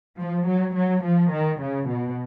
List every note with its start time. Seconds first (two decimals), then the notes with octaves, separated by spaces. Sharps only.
0.19 F3
0.48 F#3
0.75 F#3
1.04 F3
1.32 D#3
1.61 C#3
1.89 B2